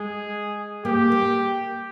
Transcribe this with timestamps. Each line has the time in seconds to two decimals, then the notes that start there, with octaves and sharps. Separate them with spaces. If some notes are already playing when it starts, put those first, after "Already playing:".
Already playing: G#3 G#4
0.85 A#3 G4
1.12 A#3